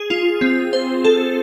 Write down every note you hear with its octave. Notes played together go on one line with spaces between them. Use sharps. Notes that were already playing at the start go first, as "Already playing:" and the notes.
Already playing: G#4
F4
C4
C5
A4